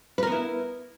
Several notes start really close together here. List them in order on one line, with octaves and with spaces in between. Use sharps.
B4 A#4 B3 E4